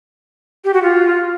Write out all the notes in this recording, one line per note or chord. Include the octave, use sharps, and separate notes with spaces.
G4
F#4
F4